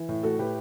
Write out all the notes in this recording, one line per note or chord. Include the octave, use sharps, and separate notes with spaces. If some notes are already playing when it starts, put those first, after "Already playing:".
Already playing: E3
A2
A3 F#4 A4
A2 G4 B4